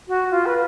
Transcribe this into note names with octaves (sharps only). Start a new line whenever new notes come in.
F#4
F4
B4